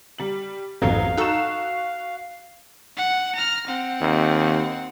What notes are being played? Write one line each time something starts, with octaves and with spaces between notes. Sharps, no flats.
G3 F#7
A1 F2 G#2 F#3 A3 B3 F5
D#4 F#4 A4 C#6 E7
F#5
A#5 F6
C4 F#5
D#2